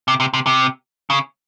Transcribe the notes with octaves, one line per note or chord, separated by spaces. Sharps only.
C3
C3
C3
C3
C#3